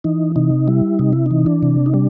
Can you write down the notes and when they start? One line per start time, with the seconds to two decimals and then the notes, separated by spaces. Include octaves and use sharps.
0.04 E3 D#4
0.36 C3 D#4
0.67 G3 E4
0.99 C3 D#4
1.13 E4
1.26 E3 D#4
1.46 D4
1.63 C3
1.86 D#4
1.94 G3 D4